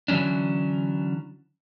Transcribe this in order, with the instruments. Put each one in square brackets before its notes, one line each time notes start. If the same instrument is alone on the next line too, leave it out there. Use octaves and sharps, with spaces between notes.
[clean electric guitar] D3 E3 F#3 C#4 D4